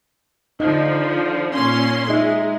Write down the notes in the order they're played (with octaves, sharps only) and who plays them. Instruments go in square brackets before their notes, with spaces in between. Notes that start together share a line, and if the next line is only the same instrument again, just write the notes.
[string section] D3 F3 [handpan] D#4 D#5
[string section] A#2 C#4 C6
[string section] G#3 [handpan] D#4 D#5 E5